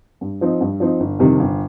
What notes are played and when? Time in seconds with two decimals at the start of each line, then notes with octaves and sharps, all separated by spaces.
0.21 G2
0.41 F3 C4 D#4
0.61 G2
0.80 F3 C4 D#4
1.00 G1
1.19 F2 C3 D#3 G3
1.39 G1